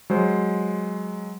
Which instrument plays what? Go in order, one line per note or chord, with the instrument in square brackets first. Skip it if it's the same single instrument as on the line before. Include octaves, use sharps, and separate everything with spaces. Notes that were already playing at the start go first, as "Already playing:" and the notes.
[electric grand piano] F#3 G#3 C5